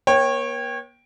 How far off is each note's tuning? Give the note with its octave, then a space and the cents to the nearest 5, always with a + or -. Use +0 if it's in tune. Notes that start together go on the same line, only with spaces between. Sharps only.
A#3 +45 C#5 -25 G5 +0